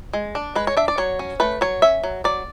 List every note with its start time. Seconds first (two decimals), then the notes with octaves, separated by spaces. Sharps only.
0.13 G#3
0.35 D4
0.56 G#3 B4
0.67 C#5
0.77 D4 E5
0.88 D5
0.98 F#3 C#5
1.19 C#4
1.40 A3 B4
1.61 F#3 C#5
1.82 C#4 E5
2.04 F#3
2.24 F#3 D5